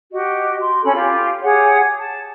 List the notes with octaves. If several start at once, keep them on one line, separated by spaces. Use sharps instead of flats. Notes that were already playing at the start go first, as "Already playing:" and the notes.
F#4 G4 D#5
C6
C#4 A4 B5
F4 G4
G4 G#4 C#5 F#5
A5